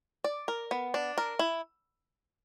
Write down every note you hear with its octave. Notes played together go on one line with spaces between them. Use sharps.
D5
A#4
B3
D4
A#4
E4